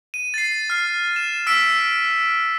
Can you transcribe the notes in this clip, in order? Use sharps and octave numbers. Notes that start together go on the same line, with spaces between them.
D#7
A6 C7
F6 C7
E7
E6 B6 D7